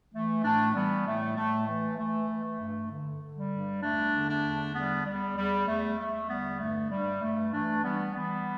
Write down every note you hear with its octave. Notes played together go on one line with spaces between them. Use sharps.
E3 A3
A2 A3 D4
D4
E3 G3 B3
A2 A3
A2 A3
E3 A3
E3 A3
E3
A3
G2
D3
D3
G3
G2
E2 A3 D4
D3
A3 D4
E2
D3 G3 B3
E2 G3
E2 G3
E2 A3
E2 A3
D3 G3 B3
G2 A3
G2 G3
G2 A3
E3 A3 D4
E3 G3 B3
E3 G3 B3